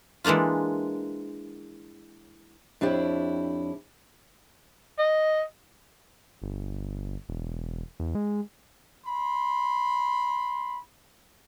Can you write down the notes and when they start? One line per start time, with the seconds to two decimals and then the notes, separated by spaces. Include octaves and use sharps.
0.24 E3 G#3 A#3 D4 F4
2.81 F2 D4 E4 G4 C#5
4.99 D#5
6.42 G1
7.29 E1
8.00 E2
8.15 G#3
9.07 B5 C6